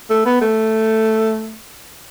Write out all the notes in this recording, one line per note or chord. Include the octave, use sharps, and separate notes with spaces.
A3
B3
A3